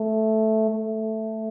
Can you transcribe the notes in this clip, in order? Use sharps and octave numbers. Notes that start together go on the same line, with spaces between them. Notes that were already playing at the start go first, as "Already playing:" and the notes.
Already playing: A3
A3